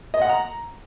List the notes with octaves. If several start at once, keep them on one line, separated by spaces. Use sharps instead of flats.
D#5
F#5
A#5